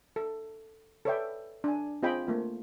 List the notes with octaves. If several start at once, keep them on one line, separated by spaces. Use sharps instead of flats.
A4
A4 B4 C#5 D5 E5 G5
D4 G#5
C4 F4 G#4 D#5 G5 B5
A3 A#3 F4